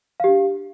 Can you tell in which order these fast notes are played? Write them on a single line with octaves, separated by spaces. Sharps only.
F5 G4 D4